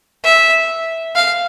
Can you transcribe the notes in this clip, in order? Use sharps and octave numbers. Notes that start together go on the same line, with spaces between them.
E5
F5